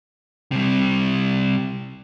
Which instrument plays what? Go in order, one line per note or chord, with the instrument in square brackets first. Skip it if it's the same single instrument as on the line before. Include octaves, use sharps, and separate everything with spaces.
[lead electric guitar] C3 G3